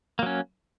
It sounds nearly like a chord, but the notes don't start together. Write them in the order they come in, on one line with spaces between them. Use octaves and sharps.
A#3 F#3 C#4